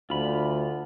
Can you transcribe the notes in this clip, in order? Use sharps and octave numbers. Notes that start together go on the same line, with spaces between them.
D2 F4 B5